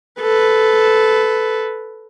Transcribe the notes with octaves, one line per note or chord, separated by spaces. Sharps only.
A4 B4